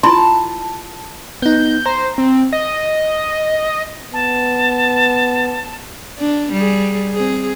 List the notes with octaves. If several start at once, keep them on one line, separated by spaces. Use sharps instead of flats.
E4 F4 A5 C6
B3 D#4 G6
C5 A#5
C4
D#5 A#6
B3 A5
D4
G3 G#4
C4 G#4